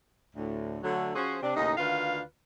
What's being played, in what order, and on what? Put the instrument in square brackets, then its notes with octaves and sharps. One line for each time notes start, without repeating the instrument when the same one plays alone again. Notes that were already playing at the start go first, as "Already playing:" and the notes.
[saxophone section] D2 A2
D3 F#3 A3
F3 C#4 F#4 G#4 C5
C3 D4
D#2 A2 C#3 D#4
D2 D3 D#3 F4 B4 F5